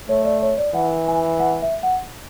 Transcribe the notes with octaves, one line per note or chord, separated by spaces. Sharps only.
A3 C#5
D5
C#5
D5
E3 F#5
G#5
F#5
E5
F#5